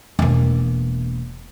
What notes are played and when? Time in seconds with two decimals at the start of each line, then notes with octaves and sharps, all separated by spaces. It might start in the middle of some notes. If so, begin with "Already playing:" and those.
0.19 E1 A#3